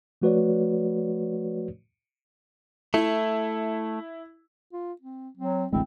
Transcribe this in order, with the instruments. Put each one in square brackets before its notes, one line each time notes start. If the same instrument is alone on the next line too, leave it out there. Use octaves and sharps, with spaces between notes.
[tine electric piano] F3 A3 F#4 B4 C#5 D5
[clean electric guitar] A3 [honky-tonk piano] E4
[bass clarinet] F4
C4
[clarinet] F#3 [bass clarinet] C4
[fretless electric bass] A1 D2 G#3 [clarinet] C4 [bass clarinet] E4